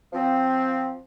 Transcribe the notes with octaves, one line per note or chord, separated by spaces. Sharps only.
F3 C4